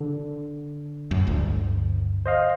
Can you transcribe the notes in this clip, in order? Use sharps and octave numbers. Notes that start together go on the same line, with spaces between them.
D3
F#2 A2
G1 D2
C5 D#5 F5